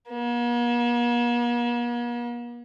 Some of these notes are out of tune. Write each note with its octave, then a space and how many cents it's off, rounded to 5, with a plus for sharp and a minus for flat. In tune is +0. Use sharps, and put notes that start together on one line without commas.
A#3 +45